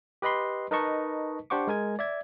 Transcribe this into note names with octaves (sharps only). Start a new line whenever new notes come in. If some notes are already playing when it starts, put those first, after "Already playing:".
G4 B4 D#5 B5 C6
D#4 A#4 B4 D#5 A5 C#6
D4 G4 C5 F#5 C#6 D6
G#3 A#4 G#5 G#6
D5 E5 G#6